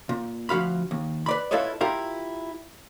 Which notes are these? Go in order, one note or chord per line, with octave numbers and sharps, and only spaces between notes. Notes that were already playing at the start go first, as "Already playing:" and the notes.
A#2
D2 F3 F#4 F5 B5
D#2
B4 D5 B5
E4 F4 A4 B4 C#5 D#5
E4 F4 G4 A#4